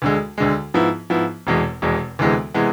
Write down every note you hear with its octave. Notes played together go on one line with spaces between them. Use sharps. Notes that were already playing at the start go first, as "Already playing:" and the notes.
D2 D3 G#3
D2 D3 G#3
G#2 F3 B3 E4
G#2 F3 B3 E4
F1 E2 B2 G#3
F1 E2 B2 G#3
D2 C3 E3 G#3 B3
C3 E3 G#3 B3